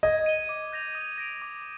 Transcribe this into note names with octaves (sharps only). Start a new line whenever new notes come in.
D#5 G#6
D#7 G7
D6
G6 A#6 F7
D#6
A#6 D7 F7
D6